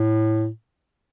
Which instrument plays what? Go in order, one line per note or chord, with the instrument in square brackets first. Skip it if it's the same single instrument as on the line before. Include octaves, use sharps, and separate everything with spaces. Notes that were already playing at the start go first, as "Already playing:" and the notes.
Already playing: [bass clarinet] A2